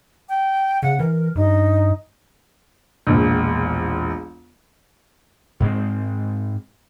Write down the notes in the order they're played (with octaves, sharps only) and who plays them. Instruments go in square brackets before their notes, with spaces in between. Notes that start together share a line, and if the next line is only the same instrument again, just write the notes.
[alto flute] G5
[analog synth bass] C#3 [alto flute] F#5
[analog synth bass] E3 [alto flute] A#4
[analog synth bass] G2 [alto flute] D#4
[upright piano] E1 A#1
[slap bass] G#2 G#3 C4